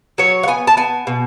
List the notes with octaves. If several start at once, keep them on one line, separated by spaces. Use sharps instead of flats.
F#3 C#5
F#5
B3 G#5
A5
B3 G#5
B2